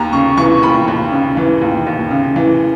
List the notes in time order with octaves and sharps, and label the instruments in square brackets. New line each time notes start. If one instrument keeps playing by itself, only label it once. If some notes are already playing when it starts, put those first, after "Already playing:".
Already playing: [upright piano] D#2 A#5
C#3 C#6
E3 C#6
D#2 B5
D#2
C#3
E3
D#2
D#2
C#3
E3